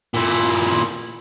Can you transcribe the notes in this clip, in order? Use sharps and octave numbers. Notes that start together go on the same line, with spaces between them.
A#2 E4